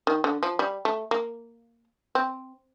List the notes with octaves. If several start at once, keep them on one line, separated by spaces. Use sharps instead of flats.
D#3
D3
F3
G3
A3
A#3
C4